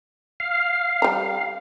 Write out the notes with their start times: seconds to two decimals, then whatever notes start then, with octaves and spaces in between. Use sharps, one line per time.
0.40 F5
1.02 G3 A#5